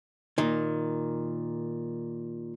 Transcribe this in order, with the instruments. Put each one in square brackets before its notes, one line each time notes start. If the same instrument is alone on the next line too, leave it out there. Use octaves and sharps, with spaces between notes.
[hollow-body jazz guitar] A#2 D#3